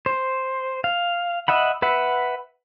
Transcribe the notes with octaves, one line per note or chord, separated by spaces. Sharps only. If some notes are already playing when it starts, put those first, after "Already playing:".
C5
F5
D#5 E5 F#5 B5
B4 E5 F#5